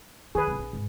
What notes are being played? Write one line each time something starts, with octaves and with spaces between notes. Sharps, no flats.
D#3 G#4 B4
C2 F#3
A#1
G#2